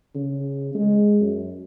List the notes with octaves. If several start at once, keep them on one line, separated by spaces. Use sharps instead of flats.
C#3
G#3
F#2